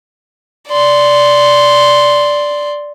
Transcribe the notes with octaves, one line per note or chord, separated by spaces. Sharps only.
D5 C6